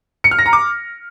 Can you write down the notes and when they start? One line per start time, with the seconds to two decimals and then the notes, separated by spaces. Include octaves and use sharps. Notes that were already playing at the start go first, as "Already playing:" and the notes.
0.24 C#7
0.31 F6
0.39 A#6
0.46 A#5
0.53 D6